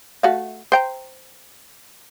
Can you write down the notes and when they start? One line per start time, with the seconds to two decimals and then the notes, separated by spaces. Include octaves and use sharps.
0.23 A3 F#4 F5
0.72 C5 G5 A#5